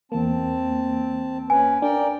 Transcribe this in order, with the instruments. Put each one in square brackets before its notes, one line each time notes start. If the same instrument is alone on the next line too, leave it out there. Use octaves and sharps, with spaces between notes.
[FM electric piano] E2 A#3 [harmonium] C4 A5
[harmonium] C#4 B4 [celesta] G#5
[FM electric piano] D4 [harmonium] A#4 D5 G5